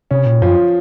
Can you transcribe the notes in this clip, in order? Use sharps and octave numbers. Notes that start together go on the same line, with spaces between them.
C3 C#4
A#2
F#2 F3